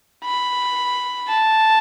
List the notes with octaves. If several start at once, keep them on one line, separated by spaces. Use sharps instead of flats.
B5
A5